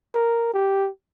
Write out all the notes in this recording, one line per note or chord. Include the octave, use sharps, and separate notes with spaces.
A#4
G4